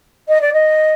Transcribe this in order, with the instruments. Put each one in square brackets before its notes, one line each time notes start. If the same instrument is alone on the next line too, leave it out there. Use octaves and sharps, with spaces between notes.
[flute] D#5
D5
D#5